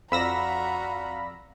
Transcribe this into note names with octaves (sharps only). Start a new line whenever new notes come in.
F2 F#4 D5 F5 A#5 B5 E6 A#6